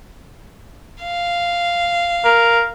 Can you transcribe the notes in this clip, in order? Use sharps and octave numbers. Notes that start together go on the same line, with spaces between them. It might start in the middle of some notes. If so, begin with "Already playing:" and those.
F5
A#4